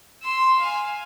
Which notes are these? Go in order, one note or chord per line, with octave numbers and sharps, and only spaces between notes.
C6 E6
F5 G#5